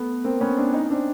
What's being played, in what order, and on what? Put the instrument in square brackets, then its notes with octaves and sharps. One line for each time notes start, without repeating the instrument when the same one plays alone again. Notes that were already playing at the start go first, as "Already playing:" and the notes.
Already playing: [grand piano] A3 B3
A#3 C4
B3 C#4
C4 D4
C#4 D#4
C4 D4